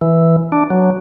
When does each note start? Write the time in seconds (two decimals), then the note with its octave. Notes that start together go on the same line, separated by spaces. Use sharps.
0.01 E3
0.52 D4
0.70 F#3